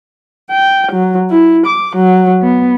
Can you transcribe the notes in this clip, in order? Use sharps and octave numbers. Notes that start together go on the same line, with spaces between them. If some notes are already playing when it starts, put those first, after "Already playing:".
G5
F#3
E4
D6
F#3
B3